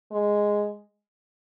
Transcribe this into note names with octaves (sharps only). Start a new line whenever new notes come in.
G#3